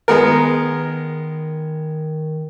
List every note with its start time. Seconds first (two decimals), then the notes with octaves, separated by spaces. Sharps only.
0.08 D#3 G#3 B3 A#4